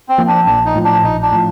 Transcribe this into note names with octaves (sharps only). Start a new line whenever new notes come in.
C4
F3 A#3
D4
A#1 D4
D#4
A2 F3
D4
A#1 D#4
D4
A2 F3